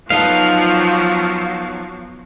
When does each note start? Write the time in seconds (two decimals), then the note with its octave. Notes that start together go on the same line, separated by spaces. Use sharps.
0.10 F3 F#3 B3 D#4 A4 F5